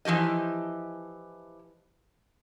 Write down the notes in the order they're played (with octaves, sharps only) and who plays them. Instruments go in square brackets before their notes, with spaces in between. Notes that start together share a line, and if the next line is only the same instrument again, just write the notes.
[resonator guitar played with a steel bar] E3 F3 G4 D#5